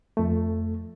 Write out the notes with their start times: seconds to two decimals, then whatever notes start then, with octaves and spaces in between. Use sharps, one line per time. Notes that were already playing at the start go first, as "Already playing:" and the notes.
0.17 F2 A3